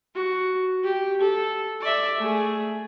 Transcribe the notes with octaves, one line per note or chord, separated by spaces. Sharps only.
F#4
G4
A4
D5 E5
A3 G#4